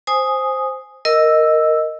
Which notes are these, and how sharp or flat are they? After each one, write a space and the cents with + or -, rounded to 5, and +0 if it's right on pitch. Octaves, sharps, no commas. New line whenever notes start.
C5 +0 G#5 +0 D#6 +0
A#4 -5 D#5 +0 E6 +0